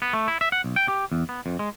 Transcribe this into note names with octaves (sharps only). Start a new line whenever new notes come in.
B3
A3
E4
E5
F#5
B1
G5
G4
E2
B3
F2
G#3